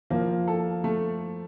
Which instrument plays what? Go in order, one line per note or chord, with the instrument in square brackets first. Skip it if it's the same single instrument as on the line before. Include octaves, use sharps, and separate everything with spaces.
[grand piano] F3 [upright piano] A#3
[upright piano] A4
A3